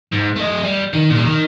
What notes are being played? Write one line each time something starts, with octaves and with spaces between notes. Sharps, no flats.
G#2
A3 D#5
G3
D#3
A#2 G3
D#4 A#4